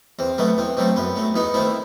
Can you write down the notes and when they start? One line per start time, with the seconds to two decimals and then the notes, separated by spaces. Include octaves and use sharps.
0.19 E2 C4
0.38 B2 F#3 A3 B3
0.57 E2 C4
0.77 B2 F#3 A3 C4
0.96 F#2 B3
1.16 F#3 A3
1.34 E2 B3 D#4
1.54 D#3 A3 C4 E4